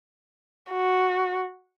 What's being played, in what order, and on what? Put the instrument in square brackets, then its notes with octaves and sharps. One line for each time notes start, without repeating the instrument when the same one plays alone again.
[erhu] F#4